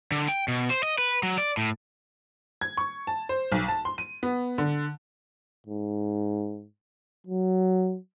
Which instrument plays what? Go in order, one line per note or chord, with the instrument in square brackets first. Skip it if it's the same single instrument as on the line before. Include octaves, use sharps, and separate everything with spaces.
[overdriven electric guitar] D3
G5
B2
C5
D#5
B4
F#3
D5
A2
[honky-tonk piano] G#6
C#6
A5
C5
B1
A5
C6
D#7
B3
D3
[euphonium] G#2
F#3